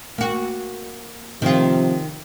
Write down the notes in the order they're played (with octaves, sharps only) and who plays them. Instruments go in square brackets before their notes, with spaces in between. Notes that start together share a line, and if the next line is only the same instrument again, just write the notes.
[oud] A#3 F#4
[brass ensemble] C3 F3 [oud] D#3 F4